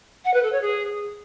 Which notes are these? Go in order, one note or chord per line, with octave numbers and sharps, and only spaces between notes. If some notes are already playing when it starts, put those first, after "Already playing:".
F#5
B4
A4
C#5
G#4